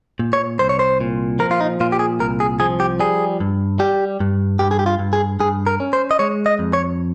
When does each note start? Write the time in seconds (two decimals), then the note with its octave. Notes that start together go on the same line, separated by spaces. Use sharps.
0.19 A#2
0.33 C#5
0.59 C2 C5
0.69 C#5
0.79 C5
1.01 A#2
1.39 F3 A#4
1.51 F4
1.60 D#4
1.80 A#2 F4
1.92 G4
1.99 G#4
2.20 C2 A#4
2.40 G#4
2.60 F3 G#4
2.80 G4
3.00 G3 G#4
3.40 G2
3.79 G3 G4
4.20 G2
4.59 G2 G4
4.71 G#4
4.79 G4
4.86 F4
4.99 G2
5.13 G#4
5.40 G2 G#4
5.67 A#4
5.80 C#4
5.93 C5
6.11 D#5
6.19 G#3 C#5
6.46 D#5
6.59 F2
6.73 C#5